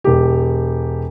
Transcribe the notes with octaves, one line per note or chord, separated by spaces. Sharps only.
E1 G4